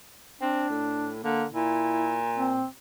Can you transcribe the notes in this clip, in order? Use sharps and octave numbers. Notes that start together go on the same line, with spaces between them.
C4 D4
A2
D3 A#3
A#2 E4
C4